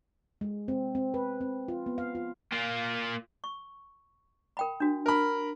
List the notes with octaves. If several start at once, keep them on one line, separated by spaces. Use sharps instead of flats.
G#3
C4
C4
B4
C4
F4
B3
F5
F4
A#3 F4
C#6
A#4 G5 B5
D4 F#4
A#4 B5